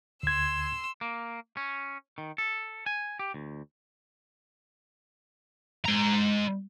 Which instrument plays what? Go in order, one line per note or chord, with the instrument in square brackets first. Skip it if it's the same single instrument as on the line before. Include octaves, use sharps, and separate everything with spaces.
[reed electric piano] D2 G#6 [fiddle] C6 E6
[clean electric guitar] A#3
C#4
D#3
A4
G#5
G4
D2
[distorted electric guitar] G#3 A#5